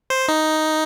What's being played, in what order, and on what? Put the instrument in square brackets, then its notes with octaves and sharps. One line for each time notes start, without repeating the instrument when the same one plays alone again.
[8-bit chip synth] C5
D#4